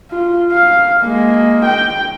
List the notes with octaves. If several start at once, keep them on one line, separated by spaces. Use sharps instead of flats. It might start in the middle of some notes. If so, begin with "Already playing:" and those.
F4
F5
G#3 A#3
G5